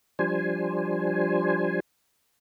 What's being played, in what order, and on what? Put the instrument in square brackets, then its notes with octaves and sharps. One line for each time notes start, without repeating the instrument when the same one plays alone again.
[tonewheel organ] F3 G3 D4 C5 G#5